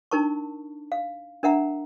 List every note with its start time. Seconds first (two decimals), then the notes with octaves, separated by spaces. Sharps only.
0.11 D4 D#4 A#4 A5 C#6
0.92 F5
1.43 D4 A#4 E5 F#5 A#5